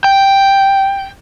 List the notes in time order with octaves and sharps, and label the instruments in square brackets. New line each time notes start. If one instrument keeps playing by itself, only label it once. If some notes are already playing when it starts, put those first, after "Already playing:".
[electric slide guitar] G5